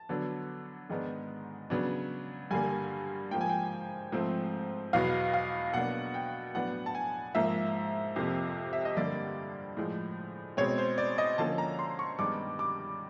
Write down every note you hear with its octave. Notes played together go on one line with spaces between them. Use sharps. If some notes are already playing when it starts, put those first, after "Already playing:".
Already playing: A5
D3 F#3 B3 D4
G#2 D#3 G#3 B3 D4
C#3 F#3 B3 D4
G2 D3 G3 A#3 G#5
G#2 F3 A#3 G5
G#5
G5
G#2 F3 A3 C4
E2 B2 F#3 B3 F5
F5
B2 F#3 A#3 D4 F#5
G5
A2 F#3 B3 D4 F#5
A5
G#5
G#2 F3 A#3 E5
F2 C3 F3 A#3
E5
D#5
G2 D3 G3 A#3 D5
A2 F3 G#3
B2 G#3 C4 C#5
C5
D5
D#5
D3 F3 A#3 C#4 A5
A#5
C6
C#6
G2 D#3 G#3 B3 D4 D6
D6